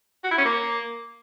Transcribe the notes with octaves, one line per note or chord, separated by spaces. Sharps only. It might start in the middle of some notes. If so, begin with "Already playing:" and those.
F#4
E4
C#4
A#3